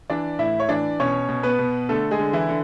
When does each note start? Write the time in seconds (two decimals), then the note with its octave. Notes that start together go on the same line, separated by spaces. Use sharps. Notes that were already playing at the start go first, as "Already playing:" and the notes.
0.10 E3 D4 D5
0.39 A2 E4 E5
0.60 C#5
0.69 E3 D4 D5
1.00 B2 C#4 C#5
1.28 B2
1.43 B3 B4
1.59 B2
1.89 D3 A3 A4
2.11 G#3 G#4
2.19 D3
2.33 E3 E4
2.49 D3